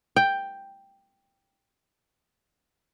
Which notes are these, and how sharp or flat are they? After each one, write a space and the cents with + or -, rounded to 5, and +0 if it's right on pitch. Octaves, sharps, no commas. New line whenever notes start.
G5 +5